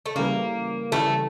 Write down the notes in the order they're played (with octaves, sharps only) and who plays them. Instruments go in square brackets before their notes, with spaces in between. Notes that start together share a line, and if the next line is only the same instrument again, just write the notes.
[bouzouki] A3
[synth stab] C#3 E3 G3 [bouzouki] A#3
[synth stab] C#3 E3 G3 [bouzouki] A3